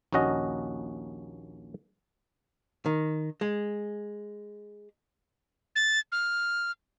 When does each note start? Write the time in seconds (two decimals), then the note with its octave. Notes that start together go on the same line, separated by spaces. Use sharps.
0.13 A#1 D#2 C#4 F#4 D#5
2.86 D#3
3.41 G#3
5.76 A6
6.12 F6